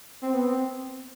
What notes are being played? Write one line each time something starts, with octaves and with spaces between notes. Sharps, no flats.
C4
B3
C4